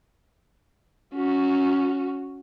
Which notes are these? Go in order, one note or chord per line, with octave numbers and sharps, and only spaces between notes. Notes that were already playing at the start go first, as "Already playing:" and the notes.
C#4 F#4